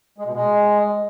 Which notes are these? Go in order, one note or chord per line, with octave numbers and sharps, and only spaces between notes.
G#3
B2
G#3